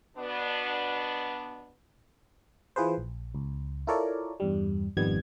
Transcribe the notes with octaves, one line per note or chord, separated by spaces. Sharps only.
B2 B3 D4
E3 F4 G#4 B4 C5
A#1
C#2
E4 F4 A4 A#4 C#5 D5
E2 G2 G3
G#1 F2 D#3 G3 B3 G#6